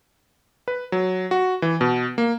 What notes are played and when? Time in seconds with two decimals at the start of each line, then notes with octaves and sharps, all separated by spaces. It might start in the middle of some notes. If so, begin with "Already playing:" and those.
0.68 B4
0.92 F#3
1.31 F#4
1.62 E3
1.81 B2
2.18 A#3